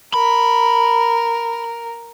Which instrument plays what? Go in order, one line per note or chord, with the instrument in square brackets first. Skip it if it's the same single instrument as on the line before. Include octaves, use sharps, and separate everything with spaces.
[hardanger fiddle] A#4 [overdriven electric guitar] B5